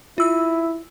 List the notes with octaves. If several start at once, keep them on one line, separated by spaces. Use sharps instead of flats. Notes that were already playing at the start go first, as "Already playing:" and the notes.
E4 F4 E6